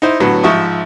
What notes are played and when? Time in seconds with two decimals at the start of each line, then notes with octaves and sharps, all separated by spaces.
0.02 D#4 E4 C5
0.20 A2 D3 F#3 B3
0.43 G#2 F3 E5 C#6 D#6